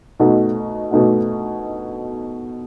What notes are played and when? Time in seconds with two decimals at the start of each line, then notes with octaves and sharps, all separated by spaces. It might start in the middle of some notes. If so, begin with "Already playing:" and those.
0.20 B2 A3 D#4 F#4
0.91 B2 A3 D#4 F#4